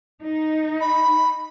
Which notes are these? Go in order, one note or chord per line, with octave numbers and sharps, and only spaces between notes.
D#4
B5